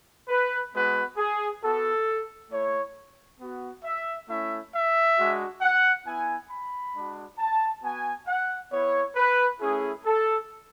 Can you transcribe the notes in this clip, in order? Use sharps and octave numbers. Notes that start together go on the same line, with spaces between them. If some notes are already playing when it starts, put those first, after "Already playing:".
B4
G#3 B3 F#4 B4
G#4
B3 F#4 A4
A3 E4 C#5
B3 F#4
E5
A3 C#4 E4 E5
E5
G#3 D4 F#4
F#5
B3 E4 G#5
B5
G#3 D4 F#4
A5
B3 F#4 G#5
F#5
B3 E4 C#5
B4
A3 C#4 E4 G#4
A4